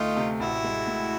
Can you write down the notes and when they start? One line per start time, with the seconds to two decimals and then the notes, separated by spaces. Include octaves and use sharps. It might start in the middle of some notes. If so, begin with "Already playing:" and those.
Already playing: D2 A3 D#4 F4
0.17 C3
0.40 A1 E4 F#4
0.64 G#3
0.87 A2